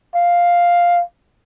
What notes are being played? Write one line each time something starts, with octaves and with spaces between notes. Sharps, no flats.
F5